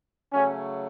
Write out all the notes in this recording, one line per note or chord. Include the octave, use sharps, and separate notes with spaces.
C#3 F#3 A3 C#4